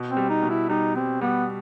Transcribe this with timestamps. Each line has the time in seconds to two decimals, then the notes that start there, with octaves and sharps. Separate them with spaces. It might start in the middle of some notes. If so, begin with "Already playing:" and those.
Already playing: B2
0.10 C4
0.17 G3
0.30 D#4
0.43 B2
0.49 E4
0.69 G3 D#4
0.96 G3 C4
1.21 G3 B3